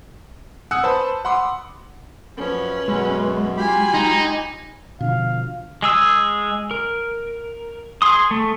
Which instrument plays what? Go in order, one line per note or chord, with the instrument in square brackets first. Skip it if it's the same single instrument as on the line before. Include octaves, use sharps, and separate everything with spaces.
[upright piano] F#5 G#5 D#6 E6 F#6 C#7
B4 C5 A5 B5
F#5 B5 C6 D6
[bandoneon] F#2 F3 [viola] C#4 B4
[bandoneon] F#2 B2 [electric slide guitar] F#3 G#3
[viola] F4 G#5 [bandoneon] G4 B5
[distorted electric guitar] D#4
[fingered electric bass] B2 D3 F3 [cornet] F5
[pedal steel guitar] G#3 G#4 E6
A#4
G#4 C6 D#6
A3